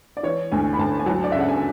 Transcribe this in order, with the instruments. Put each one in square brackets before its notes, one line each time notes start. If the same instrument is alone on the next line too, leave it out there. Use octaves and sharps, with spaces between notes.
[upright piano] D5
E3 C#5
D2 G#5
B5
D2 A5
G#5
F#3 A5
D5
C#3 E5
F#5
G#5